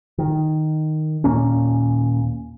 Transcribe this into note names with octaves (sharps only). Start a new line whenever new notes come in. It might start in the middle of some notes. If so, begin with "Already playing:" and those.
D#3
D#2 A#2 A#3 C#4